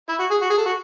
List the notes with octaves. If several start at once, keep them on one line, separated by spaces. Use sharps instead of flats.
E4
F#4
G#4
F#4
G#4
A4
F#4